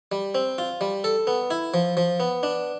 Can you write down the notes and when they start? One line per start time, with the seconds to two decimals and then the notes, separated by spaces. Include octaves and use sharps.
0.12 G3
0.35 C4
0.58 F4
0.81 G3
1.04 A4
1.27 B3
1.51 E4
1.74 F3
1.97 F3
2.20 B3
2.43 D4